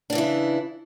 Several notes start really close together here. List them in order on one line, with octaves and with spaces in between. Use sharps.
D4 C#3 E3 E4